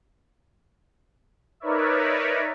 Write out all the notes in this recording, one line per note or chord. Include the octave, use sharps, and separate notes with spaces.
D#4 A#4 B4 C#5 D5 E5